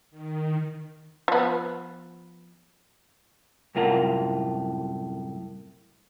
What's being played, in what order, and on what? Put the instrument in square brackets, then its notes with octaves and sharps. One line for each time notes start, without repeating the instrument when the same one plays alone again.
[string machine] D#3
[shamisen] F3 B3
[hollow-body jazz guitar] C2 F#2 A2 F4 A#4 F#5